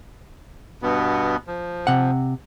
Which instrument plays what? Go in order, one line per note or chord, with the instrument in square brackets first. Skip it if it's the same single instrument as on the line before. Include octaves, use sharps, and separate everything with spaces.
[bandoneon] G2 B2 B3
F3
[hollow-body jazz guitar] C3 F#5